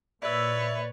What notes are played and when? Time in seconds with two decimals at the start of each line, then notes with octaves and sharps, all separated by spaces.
0.22 A#2 E4 B4 C#5 D5 E5